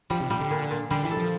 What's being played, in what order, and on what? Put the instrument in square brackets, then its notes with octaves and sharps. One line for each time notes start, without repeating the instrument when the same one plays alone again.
[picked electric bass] F3 [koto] G3
[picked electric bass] C3
[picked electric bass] A#2 [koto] G3
[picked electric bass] D3
[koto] A#2
A#2
[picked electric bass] D3 [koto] G3
[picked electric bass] E3
[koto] A4
[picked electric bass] F3